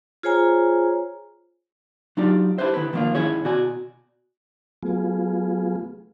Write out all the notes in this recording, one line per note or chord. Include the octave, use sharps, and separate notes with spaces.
F4 G#4 C5 C#5 G#5 A#5
F#3 D4 D#4 F4 G4 D5
D4 E4 G4 B4 C5 E5
D3 D#3 D4 E4 B4
D#3 F3 A3 A#3 D4 F4
D#3 C#4 E4 G#4 C#5
B2 F#4 D5 G#5 A#5
F#3 A3 B3 F4 G#4